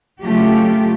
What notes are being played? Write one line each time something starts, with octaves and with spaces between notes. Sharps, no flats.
C#3 F#3 A3 F4 G4